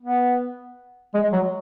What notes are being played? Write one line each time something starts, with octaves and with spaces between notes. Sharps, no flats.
B3
G#3
F#3